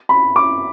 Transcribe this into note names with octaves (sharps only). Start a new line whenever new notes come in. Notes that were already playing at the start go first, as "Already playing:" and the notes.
B5
D6